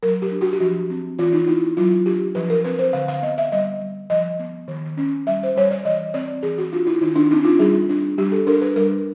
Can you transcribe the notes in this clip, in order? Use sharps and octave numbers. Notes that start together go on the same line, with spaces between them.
F#3 A#4
G4
D4
F#4
G4
F3 F#4
C4
E3 F4
D#4
B3 E4
F#3 F4
D4 G4
F3 B4
A#4
C4 B4
C5
D3 F5
F5
B3 D#5
E5
G3 D#5
G3
F3 D#5
B3
D#3
C#4
G3 E5
C5
G3 C#5
D5
E3 D#5
C4 D5
E3 G#4
F#4
D4 F4
E4
D#3 D#4
D4
C4 D#4
F4
G3 G#4
D4
G3 G4
A4
D4 A#4
B4
G3 A#4